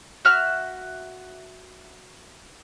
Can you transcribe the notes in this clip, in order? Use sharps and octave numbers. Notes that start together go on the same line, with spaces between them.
F#4 E5 F6 F#6